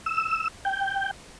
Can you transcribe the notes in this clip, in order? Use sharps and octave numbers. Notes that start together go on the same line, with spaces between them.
E6
G5